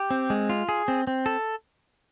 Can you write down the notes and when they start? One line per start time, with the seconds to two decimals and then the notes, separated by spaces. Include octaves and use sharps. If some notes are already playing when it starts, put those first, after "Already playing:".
Already playing: G4
0.11 C4
0.30 G#3
0.50 F4
0.69 G#4
0.88 C4
1.07 C4
1.26 A4